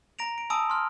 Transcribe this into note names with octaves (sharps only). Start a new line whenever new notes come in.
A#5 A#6 D7 F7
D7
G#5 A5 B5 D#6 E6 D7
C6 F6